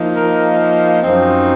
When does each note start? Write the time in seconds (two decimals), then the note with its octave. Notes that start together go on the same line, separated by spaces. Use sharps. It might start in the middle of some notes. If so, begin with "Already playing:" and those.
Already playing: F3 A#3 D#4
0.17 A#4
1.02 F#2 F3 C4 D#4